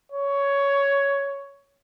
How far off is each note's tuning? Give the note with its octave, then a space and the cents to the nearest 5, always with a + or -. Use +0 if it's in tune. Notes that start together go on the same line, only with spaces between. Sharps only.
C#5 +10